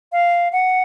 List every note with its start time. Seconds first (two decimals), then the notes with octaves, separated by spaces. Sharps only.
0.12 F5
0.52 F#5